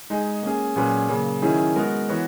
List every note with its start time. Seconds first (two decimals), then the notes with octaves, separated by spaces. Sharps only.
0.10 G#3 D#4 G#4
0.43 A#3 C#4 G#4
0.76 A#2 F#3 C#4 G#4 B4
1.09 C#3 F#3 A#3
1.42 D#3 F#3 C#4 E4 G#4
1.76 G#3 B3 F#4 A#4
2.09 E3 B3 F#4 C#5